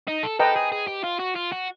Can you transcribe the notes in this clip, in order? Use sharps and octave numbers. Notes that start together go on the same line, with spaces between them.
D#4
A4
A4 B4 D#5 G5 A#5
G#4
G#4
G4
F4
F#4
F4
F#4